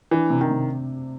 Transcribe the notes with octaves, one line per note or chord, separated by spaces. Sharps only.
E3 D4
C3
D#3
C3